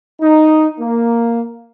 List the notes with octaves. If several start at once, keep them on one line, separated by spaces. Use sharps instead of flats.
D#4
A#3